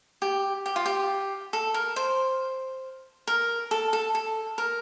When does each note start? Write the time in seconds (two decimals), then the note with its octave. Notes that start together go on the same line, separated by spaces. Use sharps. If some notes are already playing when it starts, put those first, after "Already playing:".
0.22 G4
0.66 G4
0.76 F4
0.86 G4
1.53 A4
1.74 A#4
1.96 C5
3.27 A#4
3.71 A4
3.93 A4
4.15 A4
4.58 A#4